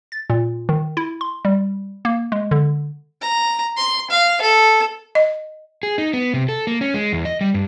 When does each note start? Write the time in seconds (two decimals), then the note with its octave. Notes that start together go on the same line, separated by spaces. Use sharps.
0.12 A6
0.30 A#2
0.69 D#3
0.97 E4
1.21 C6
1.45 G3
2.05 A#3
2.32 G#3
2.51 D3
3.21 A#5
3.77 C6
4.10 F5
4.42 A4
5.15 D#5
5.83 G#4
5.98 D#4
6.13 B3
6.34 C3
6.49 A4
6.67 A#3
6.81 C#4
6.94 G#3
7.13 E2
7.25 D#5
7.41 G3
7.54 G2